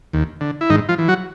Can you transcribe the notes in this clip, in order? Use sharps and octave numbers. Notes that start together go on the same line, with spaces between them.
D#2
D3
E4
G#2 D#3 D#4
F3 F4
E3
F#3 F#4